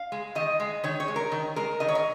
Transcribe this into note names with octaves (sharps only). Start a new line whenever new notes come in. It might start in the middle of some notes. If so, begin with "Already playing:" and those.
Already playing: F5
G#3
D#3 D#5
G#3
D#3 C#5
C#5
G#3
A#4
D#3
G#3 A#4
D#3 D#5
C#5
A#4